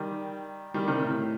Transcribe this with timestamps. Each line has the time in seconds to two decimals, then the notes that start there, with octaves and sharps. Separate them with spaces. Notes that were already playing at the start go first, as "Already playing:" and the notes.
Already playing: D#3 G3
0.74 D#3 G3
0.88 C3 D#3
1.02 A2